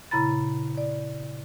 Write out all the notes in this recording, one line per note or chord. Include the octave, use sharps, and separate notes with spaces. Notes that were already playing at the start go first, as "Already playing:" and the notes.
A#2 C#3 E4 A#5 B5 A6
D5